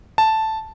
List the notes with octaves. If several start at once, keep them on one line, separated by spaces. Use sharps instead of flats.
A5